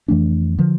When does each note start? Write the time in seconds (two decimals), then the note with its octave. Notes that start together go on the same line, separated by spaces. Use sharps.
0.08 F2 E3 A3 D4
0.58 D3 F3